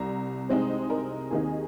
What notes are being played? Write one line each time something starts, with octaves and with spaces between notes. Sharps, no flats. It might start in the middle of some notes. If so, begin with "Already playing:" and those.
Already playing: C2 C3 A#5
C3 G#3 C4 D#4 C5
A#4
D#2 D#3 C4 D#4 G#4